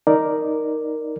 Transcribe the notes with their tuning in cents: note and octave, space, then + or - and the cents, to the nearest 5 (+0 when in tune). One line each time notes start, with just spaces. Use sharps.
D#4 +0 A#4 +0 D5 +0